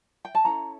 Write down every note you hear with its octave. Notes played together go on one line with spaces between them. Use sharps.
G5
A5
C#4 E4 A4 A#5